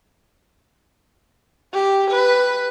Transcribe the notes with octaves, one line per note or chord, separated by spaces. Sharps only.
G4
B4